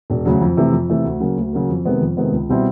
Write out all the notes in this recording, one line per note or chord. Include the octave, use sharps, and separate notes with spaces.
E1
D2 C#3 F#3
F2
C3 E3 A3
F2
C3 E3 A3
D2
C#3 F#3 A#3
D2
C#3 F#3 A#3
F2
C3 D#3 G#3 B3
F2
C3 D#3 G#3 B3
C#2
B2 G3 C4 E4